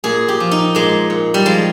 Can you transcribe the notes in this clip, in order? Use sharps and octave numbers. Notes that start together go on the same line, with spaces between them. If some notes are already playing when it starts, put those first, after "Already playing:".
A#2 G#4
G4
F3
D#4
A#2 G#3
A#2
G3
F3 G#3